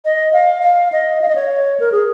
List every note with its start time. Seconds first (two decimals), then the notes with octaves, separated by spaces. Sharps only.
0.05 D#5
0.33 F5
0.62 F5
0.92 D#5
1.21 F5
1.28 D#5
1.35 C#5
1.80 A#4
1.92 G#4